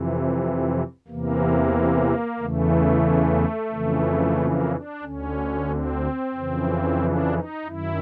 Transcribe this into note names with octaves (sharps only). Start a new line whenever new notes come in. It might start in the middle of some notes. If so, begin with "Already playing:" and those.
Already playing: F2 C3 E3
E2 C3 E3 A#3
E2 C#3 E3 A3
F2 C#3 E3
A#3
D4
D2 D3 C#4
C4
F2 C#3 E3
D4
D#4
F#2 D#3 E4